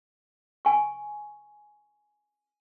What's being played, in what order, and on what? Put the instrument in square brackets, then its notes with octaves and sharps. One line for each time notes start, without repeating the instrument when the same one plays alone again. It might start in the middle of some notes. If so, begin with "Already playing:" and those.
[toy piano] G#5 C#6